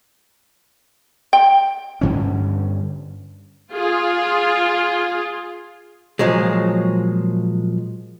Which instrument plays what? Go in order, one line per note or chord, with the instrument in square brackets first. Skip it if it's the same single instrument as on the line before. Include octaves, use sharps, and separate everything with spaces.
[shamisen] G5
[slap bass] G2 D3 C#4
[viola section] F4 G#4
[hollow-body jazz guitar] A#2 F3 F#3 G#3